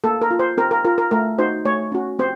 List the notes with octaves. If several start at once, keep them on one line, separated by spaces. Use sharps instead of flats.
A#3 A4
A#4
F4
C5
C4 A#4
A#4
F4 A#4
A#4
A3 A#4
D#4 F#4 C5
A3 C#5
C#4 F#4
C4 C5